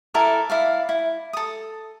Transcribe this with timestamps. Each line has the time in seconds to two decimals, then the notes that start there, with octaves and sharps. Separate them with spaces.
0.14 E4 A4 A#4 D5
0.50 E4 D5 F5
0.89 E4
1.33 A4 D#6